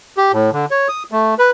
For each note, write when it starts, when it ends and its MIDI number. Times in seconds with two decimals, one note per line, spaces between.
0.17 0.32 67
0.33 0.50 45
0.53 0.65 50
0.71 0.88 73
0.88 1.03 87
1.12 1.35 57
1.39 1.51 71